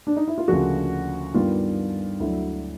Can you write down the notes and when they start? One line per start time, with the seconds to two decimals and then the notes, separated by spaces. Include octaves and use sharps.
0.07 D4
0.17 D#4
0.28 E4
0.38 F4
0.48 D2 C#3 F3 A#3 F#4
1.34 G2 D#3 G3 B3 F4
2.20 D2 D3 F#3 E4